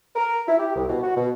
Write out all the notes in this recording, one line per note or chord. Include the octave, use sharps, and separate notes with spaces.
A#4
E4
G4
C2
B2
F#4
B2